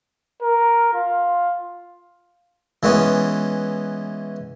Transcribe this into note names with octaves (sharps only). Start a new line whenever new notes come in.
A#4
F4
E3 G#3 B3 C#4